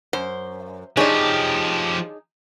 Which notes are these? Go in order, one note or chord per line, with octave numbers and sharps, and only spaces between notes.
F#2 C5
F3 D4 D#4 G4 G#4 C#5